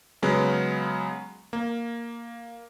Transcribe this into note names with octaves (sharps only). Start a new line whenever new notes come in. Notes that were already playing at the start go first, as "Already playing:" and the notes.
C#3 F#3 G#3 B3
A#3